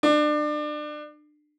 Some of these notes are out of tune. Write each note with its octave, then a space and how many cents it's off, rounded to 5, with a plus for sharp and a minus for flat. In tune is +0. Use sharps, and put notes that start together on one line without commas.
D4 +30